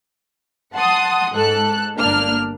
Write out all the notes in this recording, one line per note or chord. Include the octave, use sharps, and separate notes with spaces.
F#5 A5 C6 D#6
G#2 A4 F#6
G1 A#3 D4 F6